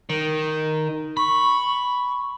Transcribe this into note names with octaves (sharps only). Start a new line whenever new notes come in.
D#3
B5 C#6